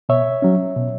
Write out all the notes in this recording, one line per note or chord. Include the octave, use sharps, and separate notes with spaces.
B2 C#5 E5
F#3 C#4
B2